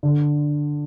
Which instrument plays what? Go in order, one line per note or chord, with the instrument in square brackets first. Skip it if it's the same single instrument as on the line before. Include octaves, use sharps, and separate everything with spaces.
[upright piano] D3